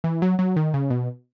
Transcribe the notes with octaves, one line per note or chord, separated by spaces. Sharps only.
E3
F#3
F#3
D#3
C#3
B2